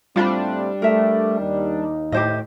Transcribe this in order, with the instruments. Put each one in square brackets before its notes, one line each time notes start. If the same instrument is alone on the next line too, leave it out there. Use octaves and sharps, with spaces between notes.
[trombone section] A2 A3 C4 [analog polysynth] G3 D4 [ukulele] F4 F#5 B5
[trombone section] A3 [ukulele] A#4 E5
[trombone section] D#2 D#4
[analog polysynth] A2 [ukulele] G4 C5 D#5